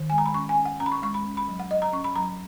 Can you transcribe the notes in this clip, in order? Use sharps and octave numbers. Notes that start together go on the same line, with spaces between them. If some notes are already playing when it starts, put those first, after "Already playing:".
Already playing: D#3
G#3 G#5
A#5
B5
C#4 C#6
G#5
C#4
F#5
C#4 A#5
B5
C#6
G#3 C#6
B5
C#4
B5
F#3
F#5
F#3 D#5
A#5
C#4 C#6
B5
F#3 A#5